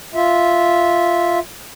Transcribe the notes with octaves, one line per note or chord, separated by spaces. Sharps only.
F4 E5